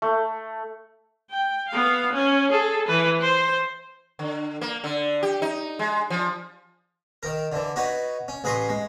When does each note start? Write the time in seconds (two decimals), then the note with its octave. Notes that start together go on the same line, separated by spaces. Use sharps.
0.02 A3
1.31 G5
1.69 B3 F5
2.13 C#4
2.52 G#4 A4
2.87 E3 B4
3.21 C5
4.19 D3
4.61 A#3
4.84 D3
5.23 G4
5.42 D#4
5.79 G#3
6.10 F3
7.23 D#3 A#4
7.52 D3 E3
7.76 D#4 F#4 B4 C#5
8.28 C#4
8.44 A1 G#4 B4 A#5 C6 C#6
8.69 G#3